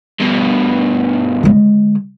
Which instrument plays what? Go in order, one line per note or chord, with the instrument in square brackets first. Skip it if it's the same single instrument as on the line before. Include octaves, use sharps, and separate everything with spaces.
[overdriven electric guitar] G2 B2
[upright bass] D3 G#3